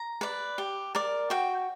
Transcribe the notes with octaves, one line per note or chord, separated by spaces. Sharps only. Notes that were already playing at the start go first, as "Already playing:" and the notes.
Already playing: A#5
B4 D5
G4
A#4 D5
F#4 G5